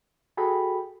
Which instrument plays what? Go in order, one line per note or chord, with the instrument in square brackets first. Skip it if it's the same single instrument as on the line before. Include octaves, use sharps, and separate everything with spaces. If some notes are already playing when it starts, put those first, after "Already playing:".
[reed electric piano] F#4 G#4 A4 G5 B5